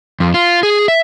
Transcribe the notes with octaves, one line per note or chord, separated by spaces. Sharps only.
F2
F4
G#4
E5